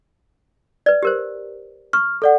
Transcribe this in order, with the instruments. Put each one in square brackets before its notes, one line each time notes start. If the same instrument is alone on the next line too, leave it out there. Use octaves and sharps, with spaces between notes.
[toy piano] B4 D5
G4 A#4 C5
[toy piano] C#6 [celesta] F6
[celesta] A4 D5 F#5